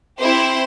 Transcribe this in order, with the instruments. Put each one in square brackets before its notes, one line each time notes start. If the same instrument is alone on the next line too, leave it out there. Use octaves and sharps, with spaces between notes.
[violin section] C4 E4 G4 C5